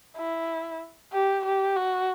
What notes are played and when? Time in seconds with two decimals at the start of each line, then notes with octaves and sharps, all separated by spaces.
0.17 E4
1.12 G4
1.45 G4
1.76 F#4